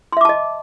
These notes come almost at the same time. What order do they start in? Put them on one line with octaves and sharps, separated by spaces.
C6 E5 D6 A5 D#5